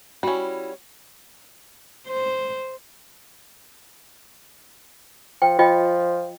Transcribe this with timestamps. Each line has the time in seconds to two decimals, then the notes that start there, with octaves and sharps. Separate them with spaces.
0.23 G3 C#4 E4 F#4
2.07 C5
5.42 F3 G5
5.59 F3 F4 D#5 G5